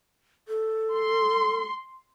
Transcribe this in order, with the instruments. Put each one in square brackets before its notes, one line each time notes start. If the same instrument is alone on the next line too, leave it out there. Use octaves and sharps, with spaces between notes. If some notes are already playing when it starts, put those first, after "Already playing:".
[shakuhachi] A4
[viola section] C6